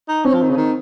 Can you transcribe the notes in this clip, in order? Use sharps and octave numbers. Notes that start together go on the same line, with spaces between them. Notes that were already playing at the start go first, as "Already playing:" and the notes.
D#4
C4 C#4
F3
D#3
C#3
D#3